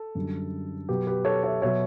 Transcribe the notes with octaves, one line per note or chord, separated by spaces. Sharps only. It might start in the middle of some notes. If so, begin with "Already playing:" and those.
Already playing: A4
F#2 D3 G3
B2 F#3 G4 B4
G4 B4
A4 C#5
C#5 E5
B2 F#3 C#5 E5